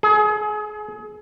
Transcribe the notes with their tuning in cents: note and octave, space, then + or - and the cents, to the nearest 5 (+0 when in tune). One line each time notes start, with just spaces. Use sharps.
G#4 +30